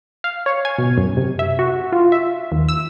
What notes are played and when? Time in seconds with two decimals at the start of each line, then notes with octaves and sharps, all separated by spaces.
0.24 F5
0.46 C#5
0.65 G#5
0.78 B2
0.98 F#2
1.17 C3
1.39 E5
1.59 F#4
1.92 F4
2.12 E5
2.52 D#2
2.69 E6